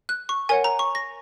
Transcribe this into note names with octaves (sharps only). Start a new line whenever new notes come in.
F#6
C#6
A#4 C#5 F#5 G#5
A#5
C#6
A#6